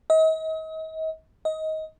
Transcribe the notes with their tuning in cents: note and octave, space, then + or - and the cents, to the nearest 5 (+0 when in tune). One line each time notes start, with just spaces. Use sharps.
D#5 +40
D#5 +20